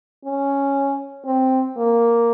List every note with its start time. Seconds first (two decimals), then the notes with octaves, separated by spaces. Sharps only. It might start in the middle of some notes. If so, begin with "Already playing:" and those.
0.25 C#4
1.26 C4
1.77 A#3